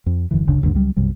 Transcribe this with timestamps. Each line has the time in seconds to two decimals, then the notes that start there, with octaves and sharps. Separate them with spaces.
0.06 F2
0.31 F1 F#2 D3 E3
0.47 F#1 D2 C#3 D4
0.62 G1 D#2 G#2 D3
0.74 C#2 F#3 G3
0.96 B1 F#2 C3 G3